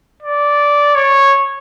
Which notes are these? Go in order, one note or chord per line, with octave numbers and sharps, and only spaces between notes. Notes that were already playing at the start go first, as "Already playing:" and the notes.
D5
C#5